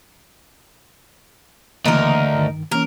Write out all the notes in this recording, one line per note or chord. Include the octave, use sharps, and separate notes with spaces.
D2 C#3 E3 A#3 D#4 A#4
G2 D#3
E3 A#3 C#4 A#4